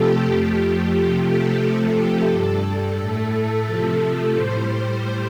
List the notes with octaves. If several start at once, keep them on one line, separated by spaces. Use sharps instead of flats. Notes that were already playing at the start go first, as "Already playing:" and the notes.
Already playing: C3 F3 A3 G4 A4
F2 F3 A3
G4
C3 F3 A3
A4
C3 F3 A3
G4
G2 G3 A4
A4
A2 A3
A4
C3 F3 A3 A4
A4
A2 G3 C5